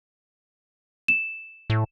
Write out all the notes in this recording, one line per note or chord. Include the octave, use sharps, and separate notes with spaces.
E7
A2